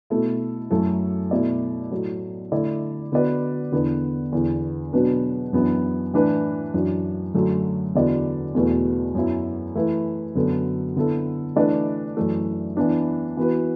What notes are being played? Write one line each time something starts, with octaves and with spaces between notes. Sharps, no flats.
B2 A3 E4 A4
F#2 F#3 A3 E4 A4
B2 A3 E4 D5
A2 F#3 A3
D3 A3 E4 D5
D3 B3 F#4 B4 D5
E2 D3 B3 D4 B4
E2 D3 B3
B2 F#3 B3 D4 B4
F#2 E3 B3 D4
A2 E3 D4 B4
F#2 E3 D4 F#4
F#2 D3 F#3 A3
E2 D3 B3 F#4 D5
E2 B2 A3 F#4 B4
F#2 F#3 B3 E4
E3 A3 E4 B4
F#2 D3 B3 F#4 A4
D3 B3 E4 A4
E3 A3 D4 B4 D5
F#2 E3 A3
E3 B3 D4
E3 B3 F#4 B4